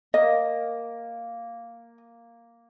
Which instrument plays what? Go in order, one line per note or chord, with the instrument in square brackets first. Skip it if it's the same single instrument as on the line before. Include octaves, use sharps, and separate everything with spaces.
[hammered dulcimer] A#3 [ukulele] D#5